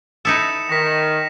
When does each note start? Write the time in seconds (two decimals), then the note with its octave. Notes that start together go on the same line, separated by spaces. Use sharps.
0.25 D#4 E4 A4 D#6 C#7 E7
0.69 D#3 A#6 B6